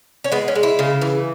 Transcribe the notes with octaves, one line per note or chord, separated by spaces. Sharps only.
C#4
G#3 B3
C#4
G#3
E4
C#3
E3